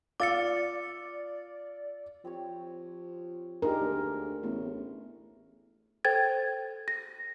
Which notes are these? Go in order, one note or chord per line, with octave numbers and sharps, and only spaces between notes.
F4 D5 F5 D6 E6 A6 C#7
F3 C4 G4 C#5
G#3 D4 D#4 G4 A#4
D2
A1 A3 B3 E4
A4 C5 G5 G#6 A6
A#6